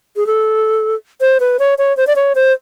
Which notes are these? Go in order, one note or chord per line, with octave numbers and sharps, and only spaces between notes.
G#4
A4
C5
B4
C#5
C#5
C5
D5
C#5
C5